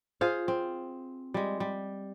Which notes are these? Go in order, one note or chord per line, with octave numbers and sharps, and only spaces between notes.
F4 G#4 C5 F5
C4
G3 G#3
G3